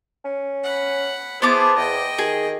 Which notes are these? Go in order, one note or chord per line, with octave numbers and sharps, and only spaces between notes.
C#4
F#5 B5
B3 E4 G#4 C5 A5 D6
E2 D#5 G5
D#3 G#4